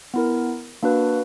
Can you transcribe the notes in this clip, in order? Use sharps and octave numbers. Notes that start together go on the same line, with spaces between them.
B3 E4 A#4
A#3 D4 F#4 B4